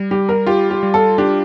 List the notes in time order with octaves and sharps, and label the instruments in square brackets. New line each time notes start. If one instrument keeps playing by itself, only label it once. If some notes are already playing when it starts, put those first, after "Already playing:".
Already playing: [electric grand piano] G3
[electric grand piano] G3 [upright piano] G4
[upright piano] A#4
[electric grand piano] F4 [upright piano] G4
[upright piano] G4
[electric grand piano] G3
[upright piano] A4
[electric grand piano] D4 [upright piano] G4